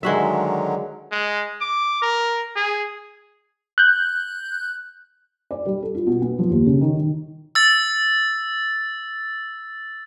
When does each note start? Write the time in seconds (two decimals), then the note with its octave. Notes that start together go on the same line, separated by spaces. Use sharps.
0.03 D3 D#3 F#3 G#3 F#4 E5
1.12 G#3
1.61 D6
2.02 A#4
2.56 G#4
3.78 F#6 G6
5.51 D5
5.66 G3
5.83 A4
5.95 F4
6.07 B2
6.22 B3
6.39 F3
6.50 D#2
6.66 C#3
6.81 D#3
6.99 D#3
7.55 E6 A6